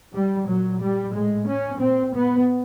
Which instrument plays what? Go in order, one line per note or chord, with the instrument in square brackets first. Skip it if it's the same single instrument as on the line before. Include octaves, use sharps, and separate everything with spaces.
[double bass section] G3
A#2 F#3
G3
A2 G#3
C#4
A#2 C4
B3